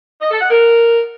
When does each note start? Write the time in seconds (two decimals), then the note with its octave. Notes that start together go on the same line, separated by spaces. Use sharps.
0.21 D#5
0.31 A4
0.41 F#5
0.51 A#4